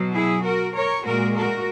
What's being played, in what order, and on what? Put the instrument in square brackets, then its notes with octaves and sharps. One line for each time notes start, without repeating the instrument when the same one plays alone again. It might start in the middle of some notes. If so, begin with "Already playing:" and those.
Already playing: [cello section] B2 F#3
E4 G#4
F#4 A#4
A#4 C#5
A#2 G#3 F#4 A#4
F#4 A#4